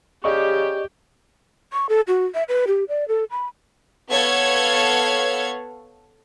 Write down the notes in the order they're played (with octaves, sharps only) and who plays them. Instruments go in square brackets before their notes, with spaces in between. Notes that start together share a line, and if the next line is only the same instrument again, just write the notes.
[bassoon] C#3 [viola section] G4 [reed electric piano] D5 D#5 C#6
[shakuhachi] C#6
A4
F#4
E5
B4
G4
D5
A4
B5
[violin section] B3 A4 C#5 F5 F#5 G#6